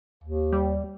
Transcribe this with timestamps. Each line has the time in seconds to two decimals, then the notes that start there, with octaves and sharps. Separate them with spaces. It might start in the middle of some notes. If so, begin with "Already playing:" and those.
0.24 D#2
0.53 G3